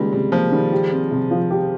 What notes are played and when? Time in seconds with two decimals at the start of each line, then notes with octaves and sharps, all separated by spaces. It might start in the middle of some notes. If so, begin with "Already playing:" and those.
Already playing: C#2 D#3 G3 G#3 A#3
0.13 C3 G3
0.32 F3 A#3
0.52 D#3 G3
0.72 G4
0.91 C4
1.11 C3
1.31 F3
1.50 G4